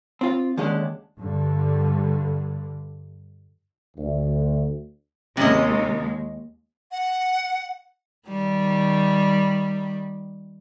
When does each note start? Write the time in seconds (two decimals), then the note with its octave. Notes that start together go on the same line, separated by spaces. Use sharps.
0.21 C4 F4
0.57 D#2 D3 G#3 C#4 D4
1.19 G2 D3
3.97 D2
5.37 D#2 C3 G#3 C#4 D#5
6.92 F#5
8.29 D#3 G3